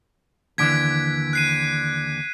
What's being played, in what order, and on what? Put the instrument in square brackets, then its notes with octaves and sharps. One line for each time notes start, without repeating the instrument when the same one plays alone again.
[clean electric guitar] D#2 D3 E3 [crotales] G#6 B6 D7
[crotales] F#6 C7 D#7